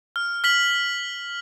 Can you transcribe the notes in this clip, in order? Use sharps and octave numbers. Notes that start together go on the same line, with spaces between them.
F6
F6 B6 F#7